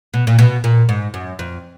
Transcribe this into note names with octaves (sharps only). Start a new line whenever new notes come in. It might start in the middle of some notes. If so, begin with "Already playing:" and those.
B2
A#2
B2
A#2
G#2
F#2
F2